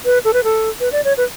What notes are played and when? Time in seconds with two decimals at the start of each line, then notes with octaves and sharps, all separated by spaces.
0.05 B4
0.24 A4
0.33 B4
0.44 A4
0.80 B4
0.92 D5
1.04 C#5
1.17 B4